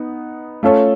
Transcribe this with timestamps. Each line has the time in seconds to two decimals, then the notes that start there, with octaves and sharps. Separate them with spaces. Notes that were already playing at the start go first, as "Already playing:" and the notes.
Already playing: B3 D#4
0.63 A3 C#4 F4 A4 C#5